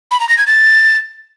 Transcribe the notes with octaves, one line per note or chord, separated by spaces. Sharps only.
B5
A#5
A#6
G#6
A6